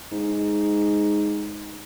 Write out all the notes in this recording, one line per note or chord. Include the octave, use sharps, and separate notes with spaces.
G#2